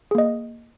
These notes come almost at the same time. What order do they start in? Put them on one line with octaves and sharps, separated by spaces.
G#4 A#3 D#5